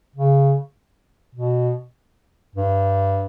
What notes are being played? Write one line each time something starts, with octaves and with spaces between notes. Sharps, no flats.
C#3
B2
G2